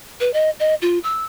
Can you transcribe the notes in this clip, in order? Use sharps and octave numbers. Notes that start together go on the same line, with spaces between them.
B4
D#5
D#5
F4
E6